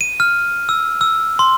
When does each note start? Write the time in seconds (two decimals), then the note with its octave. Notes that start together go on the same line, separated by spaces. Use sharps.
0.01 D#7
0.20 F6
0.69 E6
1.01 E6
1.39 C6